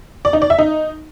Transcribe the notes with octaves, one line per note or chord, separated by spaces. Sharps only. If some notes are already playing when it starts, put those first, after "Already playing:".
D5
D#4
D5
E5
D#4